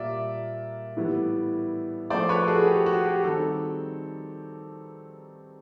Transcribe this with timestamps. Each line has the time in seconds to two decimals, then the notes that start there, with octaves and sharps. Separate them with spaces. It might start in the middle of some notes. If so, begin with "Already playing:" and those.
Already playing: A#2 G3 A#3 D5 E5
0.97 A2 E3 G3 B3 E4
2.10 F3 A3 C#4 C5 D5
2.29 B4 C#5
2.43 A4
2.48 F#4 G#4
2.67 G4
2.86 F#4
3.05 G4
3.24 D#3 G3 C4 D#4 G4 A4